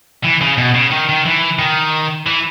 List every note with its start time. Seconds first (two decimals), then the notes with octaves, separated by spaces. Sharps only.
0.24 E3
0.41 C#3
0.58 B2
0.74 C#3
0.91 D#3
1.09 D#3
1.26 E3
1.59 D#3
2.26 E3